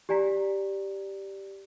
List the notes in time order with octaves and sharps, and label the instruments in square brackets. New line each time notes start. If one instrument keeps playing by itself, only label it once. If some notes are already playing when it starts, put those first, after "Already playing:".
[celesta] G4 D5 G#5 A#5 B6